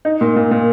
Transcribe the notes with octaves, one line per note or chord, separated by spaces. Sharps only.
D#4
A#2
A#2
A#2